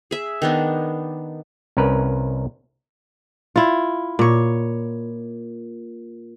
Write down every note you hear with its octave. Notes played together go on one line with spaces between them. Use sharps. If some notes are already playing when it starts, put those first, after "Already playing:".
G#4 E5
D#3 B3 D4
C2 C#4 A#4 B4
E4 F4
A#2 C#5